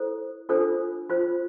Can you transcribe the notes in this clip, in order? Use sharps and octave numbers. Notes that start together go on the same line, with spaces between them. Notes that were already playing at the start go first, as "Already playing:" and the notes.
Already playing: E4 A4 C5
D4 F4 A4 C5
F4 C5